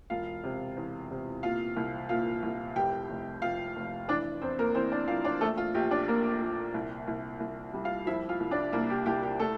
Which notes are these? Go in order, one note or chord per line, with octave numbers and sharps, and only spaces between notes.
E1 F4 F5
C3
E2
C3
A#2 F4 F5
C2
A#2 F4 F5
C2
F1 G4 G5
F1
F1 F4 F5
F1
E3 D4 D5
E2 C4 C5
A#3 A#4
E3 C4 C5
D4 D5
E3 F4 F5
D4 D5
A#1 A3 A4
F4
A#1 G4
D4 D5
A#2 A#3 A#4
A#1
C2
C2
C2
G3
F4 F5
F3 E4 E5
F4 F5
C2
D4 D5
C2 A#3 A#4
G4
C2 G4
G4
A3 A4